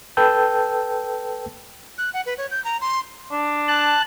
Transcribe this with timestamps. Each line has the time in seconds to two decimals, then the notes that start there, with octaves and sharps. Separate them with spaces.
0.17 A4 B4 G5 A5 E6 G6
1.98 F#6
2.14 F#5
2.26 B4
2.38 C#5
2.51 G6
2.64 A#5
2.81 C6
3.31 D4
3.68 A5 F#6